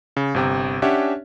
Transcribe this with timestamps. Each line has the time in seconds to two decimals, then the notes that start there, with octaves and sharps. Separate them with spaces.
0.17 C#3
0.34 G1 C3 G5
0.82 C#4 D4 G4 C#5 E5 F#5